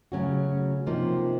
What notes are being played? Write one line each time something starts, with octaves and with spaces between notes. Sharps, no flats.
C#3 F#3 A3 C#4 F#4
C3 F3 A#3 D#4